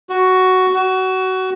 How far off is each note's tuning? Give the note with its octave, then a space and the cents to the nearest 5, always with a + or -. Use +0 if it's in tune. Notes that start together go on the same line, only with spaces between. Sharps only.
F#4 +5
F#4 +20